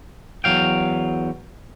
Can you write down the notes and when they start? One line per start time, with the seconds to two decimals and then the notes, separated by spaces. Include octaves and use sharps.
0.44 E2 F#3 F5 G5